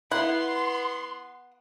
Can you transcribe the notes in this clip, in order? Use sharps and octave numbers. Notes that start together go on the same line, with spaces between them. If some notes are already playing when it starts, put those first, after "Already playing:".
B3 E4 F#5 C6